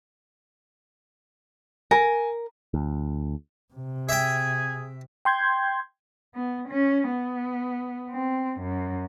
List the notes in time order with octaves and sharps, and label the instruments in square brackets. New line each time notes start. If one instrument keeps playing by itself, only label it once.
[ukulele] A#4 [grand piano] G#5
[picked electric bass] D2
[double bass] C3
[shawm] G#4 [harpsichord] E5 G5
[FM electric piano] G5 C6 G6 G#6
[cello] B3
C#4
B3
C4
F#2